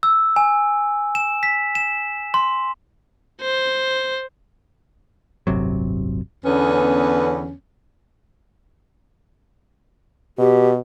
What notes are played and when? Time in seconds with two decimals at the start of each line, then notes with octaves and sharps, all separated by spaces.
0.03 E6
0.36 G#5
1.15 E7
1.43 B6
1.75 E7
2.34 C6
3.41 C5
5.47 D1 G1 C3 F#3
6.45 E2 D3 B3 C#4
10.38 B2 G4